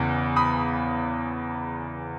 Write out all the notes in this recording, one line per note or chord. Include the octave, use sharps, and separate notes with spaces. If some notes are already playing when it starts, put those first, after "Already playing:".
Already playing: E2 C#3 E3
B5 D#6